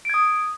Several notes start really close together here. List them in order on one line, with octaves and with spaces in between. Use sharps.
D7 G#6 D#6